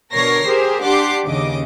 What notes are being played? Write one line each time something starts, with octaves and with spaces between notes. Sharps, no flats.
B2 D3 A#4 C#5 A#6 C7
G4 G#4 A#4 C5
D4 G4 F#5 C6 D6 C7
D#2 C#3 D#5 D6